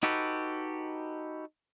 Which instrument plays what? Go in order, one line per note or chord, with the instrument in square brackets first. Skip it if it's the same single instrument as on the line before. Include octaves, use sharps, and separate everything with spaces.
[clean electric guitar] D#4 F#4 G4 A4 B4